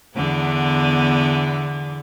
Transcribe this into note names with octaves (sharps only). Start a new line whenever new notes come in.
E2 D3 B3